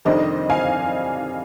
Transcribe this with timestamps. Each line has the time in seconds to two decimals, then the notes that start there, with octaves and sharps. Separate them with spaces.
0.05 F2 C3 D#3 G3 D4 C5 D#5
0.50 F5 G#5